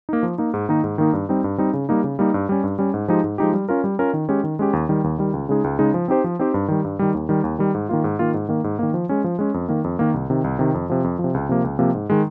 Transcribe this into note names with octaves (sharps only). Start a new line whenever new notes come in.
A#3 D#4
F3
A#3 D#4
G#2
D#3 A#3 D#4
G#2
D#3 A#3 D#4
G2
G3 C4 D#4
G2
G3 C4 D#4
C#3
G3 A#3 D#4
C#3
G3 A#3 D#4
G2
G3 C#4
G2
G3 C#4
G#2
F3 G#3 D#4 G4
G#2
F3 G#3 D#4 G4
G3
C#4 F4 A#4
G3
C#4 F4 A#4
D#3
G#3 C#4 G4
D#3
G#3 C#4 G4
D#2
D#3 G3
D#2
D#3 G3
C#2
C#3 G#3 D#4 G#4
C#2
C#3 G#3 D#4 G#4
F3
C4 D#4 G4 C5
F3
C4 D#4 G4 C5
G2
D#3 G3
G2
D#3 G3
D#2
D#3 G3
D#2
D#3 G3
G#2
D#3 A#3 F4
G#2
D#3 A#3 F4
G#2
D#3 A#3
G#2
D#3 A#3
F3
G#3 C#4
F3
G#3 C#4
F2
D#3 A#3
F2
D#3 A#3
C2
C3 D#3
C2
C3 D#3
F2
C3 F3
F2
F3
C3
C#2
C3 F3 A#3
C#2
C3 F3 A#3
G#2
D#3 G#3